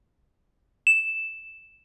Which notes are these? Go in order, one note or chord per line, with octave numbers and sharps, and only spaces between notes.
E7